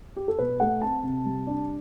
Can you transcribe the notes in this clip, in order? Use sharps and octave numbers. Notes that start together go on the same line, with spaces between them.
G4
A4
B2 B4
A3 F#5
C4 A5
C3
G3
D4